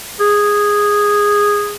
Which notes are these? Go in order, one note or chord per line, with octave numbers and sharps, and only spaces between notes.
G#4